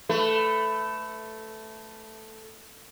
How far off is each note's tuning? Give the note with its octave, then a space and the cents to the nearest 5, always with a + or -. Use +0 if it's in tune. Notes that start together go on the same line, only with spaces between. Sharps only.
A3 +0 B4 +20